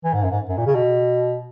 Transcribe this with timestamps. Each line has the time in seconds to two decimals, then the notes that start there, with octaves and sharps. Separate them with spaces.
0.04 E3
0.13 G#2
0.23 F#2
0.31 G#2
0.49 F#2
0.57 A#2
0.67 C#3
0.75 B2